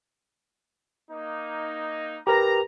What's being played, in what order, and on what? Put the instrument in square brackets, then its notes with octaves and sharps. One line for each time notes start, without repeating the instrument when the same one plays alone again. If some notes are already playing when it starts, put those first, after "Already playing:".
[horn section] A#3 D#4
[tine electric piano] G4 A#4 B4 [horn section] A#5